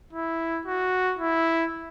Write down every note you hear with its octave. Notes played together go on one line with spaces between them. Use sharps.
E4
F#4
E4